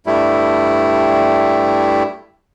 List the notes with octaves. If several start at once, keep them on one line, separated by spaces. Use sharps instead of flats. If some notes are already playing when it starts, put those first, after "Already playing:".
G2 G3 A3 E4